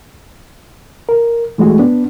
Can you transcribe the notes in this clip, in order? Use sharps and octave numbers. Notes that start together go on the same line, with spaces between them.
A#4
E3 G#3 A3 F#4 G#4
B3 D4